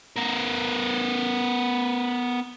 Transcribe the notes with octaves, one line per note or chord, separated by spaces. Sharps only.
B3 A#4